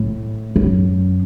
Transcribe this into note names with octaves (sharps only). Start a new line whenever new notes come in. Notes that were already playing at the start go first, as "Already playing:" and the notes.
Already playing: A2
F#2